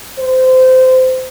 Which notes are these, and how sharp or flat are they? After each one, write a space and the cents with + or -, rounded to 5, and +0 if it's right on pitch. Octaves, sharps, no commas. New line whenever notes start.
C5 -20